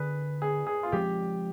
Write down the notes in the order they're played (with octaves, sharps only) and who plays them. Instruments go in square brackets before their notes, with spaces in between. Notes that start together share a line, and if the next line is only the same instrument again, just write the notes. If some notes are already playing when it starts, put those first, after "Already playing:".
Already playing: [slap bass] D3 D4 [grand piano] G#4 B4
[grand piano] G#4
G#4
F4
[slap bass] F3 G#3 C4 [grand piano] G4